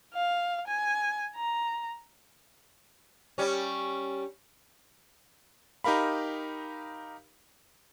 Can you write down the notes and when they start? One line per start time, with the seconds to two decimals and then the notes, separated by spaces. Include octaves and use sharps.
0.14 F5
0.67 G#5
1.35 A#5
3.38 G3 C#4
5.84 D#4 G4 A#4 F5 B5